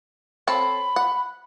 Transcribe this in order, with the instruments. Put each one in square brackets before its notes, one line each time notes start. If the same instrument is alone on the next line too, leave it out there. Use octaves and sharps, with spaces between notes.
[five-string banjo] C4 A4 C#5 [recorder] B5
[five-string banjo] F#5